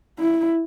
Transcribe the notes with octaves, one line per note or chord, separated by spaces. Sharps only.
E4